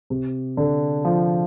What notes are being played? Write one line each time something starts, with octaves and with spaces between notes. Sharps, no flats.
C3
D3
F3